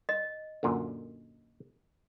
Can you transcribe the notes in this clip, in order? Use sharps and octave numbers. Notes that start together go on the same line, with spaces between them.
D#5
F#2 A#2 D3